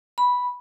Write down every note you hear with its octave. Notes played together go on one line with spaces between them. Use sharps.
B5